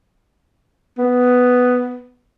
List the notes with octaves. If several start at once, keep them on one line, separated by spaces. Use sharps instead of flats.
B3